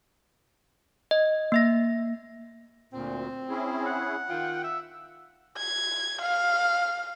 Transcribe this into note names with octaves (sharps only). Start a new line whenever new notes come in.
D#5
A#3 E5 A#6
D2 A#2 C4
C#4 E4 G#4
F#5
D#3 F4 G5
E5
G#6
F5